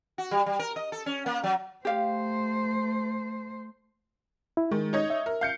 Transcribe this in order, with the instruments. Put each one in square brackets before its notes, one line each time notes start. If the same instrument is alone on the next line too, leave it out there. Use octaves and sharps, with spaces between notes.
[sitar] F#4
G3
G3
A#4
D#5
A4
C#4
A#3
F#3
[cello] A3 C5 [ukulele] G4 F5
[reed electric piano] E4
[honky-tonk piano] D#3 [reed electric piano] G#3
[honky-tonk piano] D#4 C#5 D#5
[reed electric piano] E5
[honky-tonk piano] A#4
F5 G6 C#7